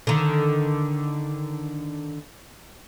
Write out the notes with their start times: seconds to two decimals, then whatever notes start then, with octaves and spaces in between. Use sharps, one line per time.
0.07 D3 D#3